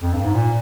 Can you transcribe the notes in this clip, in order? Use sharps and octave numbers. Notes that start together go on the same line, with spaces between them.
F2
G2
G#2
A#2